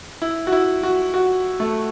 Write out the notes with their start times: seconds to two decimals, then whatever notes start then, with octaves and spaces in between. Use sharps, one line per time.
0.22 E4
0.47 F#4
0.52 E4
0.83 F#4
1.14 F#4
1.60 A3